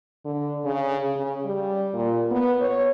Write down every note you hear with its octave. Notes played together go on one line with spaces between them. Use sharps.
D3
C#3
C#3
G3
A#2
B3
C#5